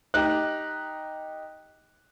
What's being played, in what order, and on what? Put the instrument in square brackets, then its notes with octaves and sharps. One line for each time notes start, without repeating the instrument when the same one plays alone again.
[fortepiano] D#4 G4 [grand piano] F#6